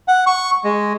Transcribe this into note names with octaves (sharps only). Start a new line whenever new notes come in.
F#5
C#6
G#3